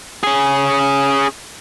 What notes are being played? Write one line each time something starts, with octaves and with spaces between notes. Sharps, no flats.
C#4 G#4